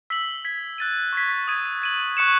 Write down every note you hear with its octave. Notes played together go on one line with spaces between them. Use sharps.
E6 B6 F#7
G#6 B6 F#7
F#6 A6 D#7
C#6 G#6 B6
D#6 G#6 D#7
G#6 D#7 F#7
C#6 F#6 C#7 E7